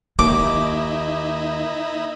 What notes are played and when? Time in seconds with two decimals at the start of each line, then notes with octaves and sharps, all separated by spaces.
0.19 D#2 A#3 D#4 E4 D6